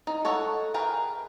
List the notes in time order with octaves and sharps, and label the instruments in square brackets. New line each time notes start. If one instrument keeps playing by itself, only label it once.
[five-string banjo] D#4
A4 C#5 D#5 F#5
G#4 A#4 B4 G5